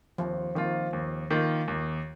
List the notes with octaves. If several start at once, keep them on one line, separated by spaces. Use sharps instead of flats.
D#2 F3
D#3 F3 A#3 F4
D#2
D#3 A#3 F4
D#2